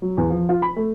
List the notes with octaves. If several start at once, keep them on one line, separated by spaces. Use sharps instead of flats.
F#3
E2
F3
F4
B5
A3